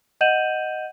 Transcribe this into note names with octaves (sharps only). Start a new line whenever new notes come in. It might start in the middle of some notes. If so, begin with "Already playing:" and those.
D#5 F#5 G6 D#7 E7 F#7